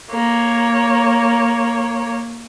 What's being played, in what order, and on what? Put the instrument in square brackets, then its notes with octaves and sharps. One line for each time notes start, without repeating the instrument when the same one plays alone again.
[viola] A#3 C#5